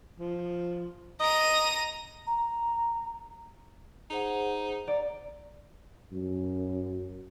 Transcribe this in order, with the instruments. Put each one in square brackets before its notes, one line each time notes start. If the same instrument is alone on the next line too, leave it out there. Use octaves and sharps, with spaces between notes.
[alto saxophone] F3
[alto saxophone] D#5 [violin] A#5 D#7
[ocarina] A#5
[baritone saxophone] D#4 [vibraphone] G#4 C5 F#5
[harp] D5 [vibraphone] A#5
[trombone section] F#2